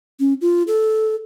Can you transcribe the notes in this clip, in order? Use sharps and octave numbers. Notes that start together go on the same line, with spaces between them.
C#4
F4
A4